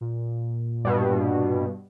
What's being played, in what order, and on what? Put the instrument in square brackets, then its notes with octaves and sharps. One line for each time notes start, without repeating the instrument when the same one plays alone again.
[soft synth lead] A#2
[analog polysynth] G2 B2